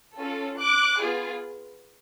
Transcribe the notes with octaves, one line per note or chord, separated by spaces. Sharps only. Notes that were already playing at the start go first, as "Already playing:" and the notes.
C#4 F4 A4
D6 F#6
B3 F4 G#4